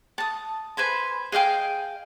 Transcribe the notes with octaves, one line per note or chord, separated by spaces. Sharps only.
A5 D#6
B4 C5 G#5 B5
G#4 D#5 F5 G5